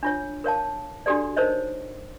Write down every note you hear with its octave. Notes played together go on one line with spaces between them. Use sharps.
D4 F4 C#5
A#4 C#5 F5 A5
D4 F#4 G4 A4 D5
D#4 A#4 C5 C#5 D#5